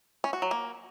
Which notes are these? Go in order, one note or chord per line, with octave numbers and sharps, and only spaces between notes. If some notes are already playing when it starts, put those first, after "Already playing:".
C#4
F#4
F#3
A#3